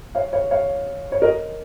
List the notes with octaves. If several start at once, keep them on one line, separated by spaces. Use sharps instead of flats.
C#5 F5
C#5 F5
C#5 F5
C#5
A#4 D#5